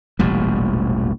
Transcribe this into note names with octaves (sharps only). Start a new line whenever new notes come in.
E1 A1 A#2 G3